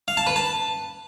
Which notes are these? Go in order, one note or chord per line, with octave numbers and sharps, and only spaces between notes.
F5
A5
B4
A5